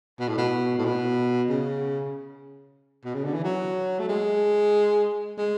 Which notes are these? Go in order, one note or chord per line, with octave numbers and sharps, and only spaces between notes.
B2
A2
B2
A2
B2
C#3
B2
C#3
D3
E3
F#3
A3
G#3
G#3